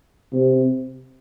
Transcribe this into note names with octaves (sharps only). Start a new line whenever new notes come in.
C3